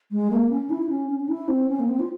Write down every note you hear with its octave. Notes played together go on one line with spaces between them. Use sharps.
G#3
A#3
C#4
E4
E4
C#4
C#4
C#4
E4
C4
C#4
A#3
C4
F4